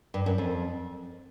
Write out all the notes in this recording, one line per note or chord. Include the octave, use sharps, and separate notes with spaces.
G2
F#2
F2